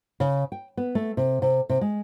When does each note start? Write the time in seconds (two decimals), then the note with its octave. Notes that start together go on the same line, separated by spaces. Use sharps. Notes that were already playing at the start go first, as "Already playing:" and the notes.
0.20 C#3
0.52 G5
0.77 B3
0.95 A3
1.17 C3
1.42 C3
1.69 C3
1.81 G#3